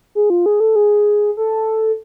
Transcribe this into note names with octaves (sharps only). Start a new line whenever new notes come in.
G#4
F4
G#4
A4
G#4
A4